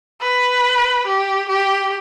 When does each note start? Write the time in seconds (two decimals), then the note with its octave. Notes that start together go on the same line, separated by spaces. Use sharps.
0.21 B4
1.07 G4
1.49 G4